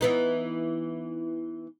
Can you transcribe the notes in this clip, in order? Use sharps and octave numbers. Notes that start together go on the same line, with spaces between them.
E3 B3 D#4